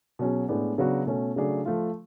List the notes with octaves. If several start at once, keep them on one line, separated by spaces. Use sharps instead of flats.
B2 F#3 C#4 G#4
A2 G#3 B3 D4
C#3 F#3 B3 D4 F#4
B2 A3 C#4
C#3 F#3 A3 D4 G#4
F3 A3 F4